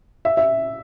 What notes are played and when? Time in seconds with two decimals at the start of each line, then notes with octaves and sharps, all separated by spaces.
0.25 E5
0.37 E5